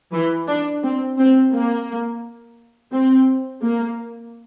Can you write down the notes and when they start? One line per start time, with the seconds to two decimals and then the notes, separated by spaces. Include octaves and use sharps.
0.13 E3
0.48 D4
0.84 C4
1.19 C4
1.53 A#3
2.93 C4
3.63 A#3